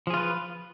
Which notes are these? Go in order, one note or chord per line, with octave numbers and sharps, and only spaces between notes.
F3 F4 G#4 B4